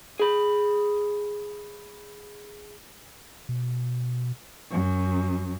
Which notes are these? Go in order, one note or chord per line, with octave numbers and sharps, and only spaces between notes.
G#4 B5
B2
F#2